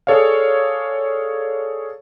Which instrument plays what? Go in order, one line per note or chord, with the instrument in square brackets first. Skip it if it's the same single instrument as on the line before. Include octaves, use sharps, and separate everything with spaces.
[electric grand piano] G#4 A4 C#5 D5 F5